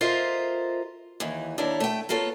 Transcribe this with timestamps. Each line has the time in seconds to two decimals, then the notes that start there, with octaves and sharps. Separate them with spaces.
0.01 F4 A4 A#4 C5 D#5 E5
1.20 D#2 E3
1.58 D#2 D4 E4 A#4 C#5
1.80 A3 G5
2.09 A#3 B3 F4 A4 C#5